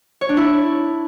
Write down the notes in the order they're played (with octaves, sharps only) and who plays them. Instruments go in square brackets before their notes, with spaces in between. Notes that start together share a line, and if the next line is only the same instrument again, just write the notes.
[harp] C#5
D4
E4